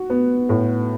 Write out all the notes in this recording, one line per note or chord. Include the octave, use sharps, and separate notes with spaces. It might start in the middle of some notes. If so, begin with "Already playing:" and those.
Already playing: F#4
B3
A2